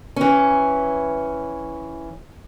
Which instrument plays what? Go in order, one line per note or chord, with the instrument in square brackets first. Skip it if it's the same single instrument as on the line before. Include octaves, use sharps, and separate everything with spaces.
[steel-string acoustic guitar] E3 C#4